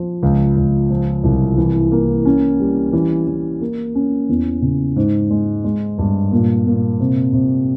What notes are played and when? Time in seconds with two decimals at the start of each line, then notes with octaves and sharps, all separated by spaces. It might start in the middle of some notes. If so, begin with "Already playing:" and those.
Already playing: F3
0.23 C#2
0.56 C#2
0.90 F3
1.24 C2
1.58 E3
1.92 A#3
2.25 C#4
2.60 G3
2.93 E3
3.28 E3
3.61 A#3
3.95 C#4
4.29 E2
4.62 C#3
4.96 G#2
5.31 G#3
5.64 G#3
5.98 G2
6.32 A#2
6.66 A#2
7.00 C3
7.33 C3